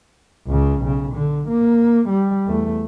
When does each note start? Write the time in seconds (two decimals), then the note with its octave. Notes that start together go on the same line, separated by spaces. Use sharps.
0.47 C#2 C#3
0.81 B1 C#3
1.14 D3
1.48 A#3
2.09 G3
2.46 E2 A3